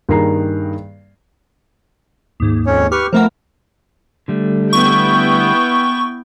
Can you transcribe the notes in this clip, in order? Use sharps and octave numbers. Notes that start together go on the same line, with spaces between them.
G2 D#3 A#3 G#4 A#5 C7
D#2 G#2
F2 C#4 C#5
G4 B4 C#6 F6
F3 A3 B3 A#4
D3 G3 A3
B3 E4 G5 C#6